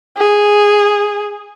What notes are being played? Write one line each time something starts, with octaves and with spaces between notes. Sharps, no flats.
G#4